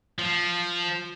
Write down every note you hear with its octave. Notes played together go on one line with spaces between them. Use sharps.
F3